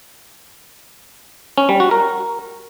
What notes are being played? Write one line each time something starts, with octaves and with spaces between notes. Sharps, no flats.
C#4
G3
F#4
A#4